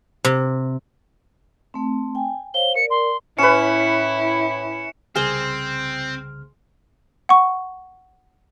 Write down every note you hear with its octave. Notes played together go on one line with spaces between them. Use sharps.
C3
A3 C4
G5 G#5
C5 C#5 F5 G7
A#4 D5 C#7
C6
A2 C#4 E4 B4 C#7 E7
C2 C#3 C4 G#4 C5 F6
F#5 C#6